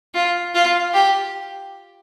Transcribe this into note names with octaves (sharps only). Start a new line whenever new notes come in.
F4
F4
G4